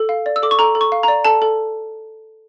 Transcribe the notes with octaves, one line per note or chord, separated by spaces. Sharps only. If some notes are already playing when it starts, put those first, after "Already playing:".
Already playing: A4
F5
D5
E6
A4 D6
C#6
A4 A#5
A4
C#6
F5
A#5
D5
A4 A5
A4